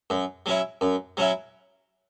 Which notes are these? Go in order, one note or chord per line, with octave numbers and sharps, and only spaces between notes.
F#2
F#3 C#4 E4
F#2
F#3 C#4 E4